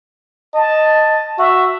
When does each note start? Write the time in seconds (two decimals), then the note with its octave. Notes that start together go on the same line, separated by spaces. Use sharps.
0.54 D#5 A5
1.39 F#4 E5